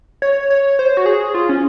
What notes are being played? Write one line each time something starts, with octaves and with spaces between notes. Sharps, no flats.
C#5
C#5
C5
F#4
G#4
F4
C#4